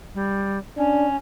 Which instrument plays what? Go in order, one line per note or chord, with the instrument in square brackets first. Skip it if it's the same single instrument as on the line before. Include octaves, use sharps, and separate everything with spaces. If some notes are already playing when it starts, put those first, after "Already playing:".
[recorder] G3
[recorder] C#4 [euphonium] D4